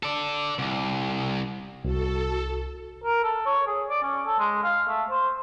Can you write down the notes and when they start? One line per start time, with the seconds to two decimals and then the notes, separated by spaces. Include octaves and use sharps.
0.03 A4 D5
0.59 C2
1.84 C2 F#4 A4
3.04 A#4
3.24 A4
3.46 C#5
3.67 G#4
3.90 D5
4.03 C#4
4.26 A4
4.39 G#3
4.63 F5
4.88 A3
5.10 C5